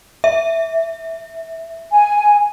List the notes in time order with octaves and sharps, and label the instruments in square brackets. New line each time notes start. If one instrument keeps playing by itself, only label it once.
[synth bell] E5
[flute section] G#5